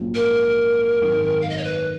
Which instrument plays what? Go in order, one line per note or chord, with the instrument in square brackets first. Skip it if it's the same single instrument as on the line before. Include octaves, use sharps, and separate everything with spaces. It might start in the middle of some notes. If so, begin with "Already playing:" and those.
Already playing: [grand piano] A#1 G#2 F#3 C#4 F4
[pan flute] A#4
[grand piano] G#1 F#2 D#3
[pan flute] F5
D#5
C#5
B4